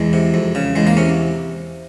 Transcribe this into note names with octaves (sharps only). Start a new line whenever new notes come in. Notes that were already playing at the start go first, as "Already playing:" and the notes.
Already playing: E2 G#3
C3
F2
C#3
E2 G#3
A#3
C3 C#4